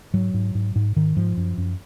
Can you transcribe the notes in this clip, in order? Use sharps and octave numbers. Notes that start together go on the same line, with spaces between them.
G#2 F#3
G#2
G#2
G#2
G#2 D#3
G#2 F3
F#2
F#2